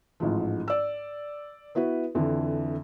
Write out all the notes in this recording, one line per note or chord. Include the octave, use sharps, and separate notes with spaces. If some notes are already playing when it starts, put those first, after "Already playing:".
A1 G#2 F3
D5 E6
B3 E4 F#4 B4
F2 D3 E3